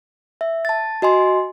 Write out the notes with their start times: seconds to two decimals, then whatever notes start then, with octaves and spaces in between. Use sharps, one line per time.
0.41 E5
0.65 A5 A6
1.02 F#4 D#5 G#5 C6